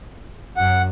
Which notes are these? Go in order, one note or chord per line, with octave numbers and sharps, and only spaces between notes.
F#2 F#5